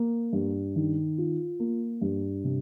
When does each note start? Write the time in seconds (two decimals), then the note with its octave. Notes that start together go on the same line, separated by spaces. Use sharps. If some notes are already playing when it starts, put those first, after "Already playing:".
Already playing: A#3
0.33 G2
0.76 D#3
1.18 F4
1.59 A#3
2.01 G2
2.44 C3